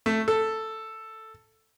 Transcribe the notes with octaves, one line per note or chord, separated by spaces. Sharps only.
A3
A4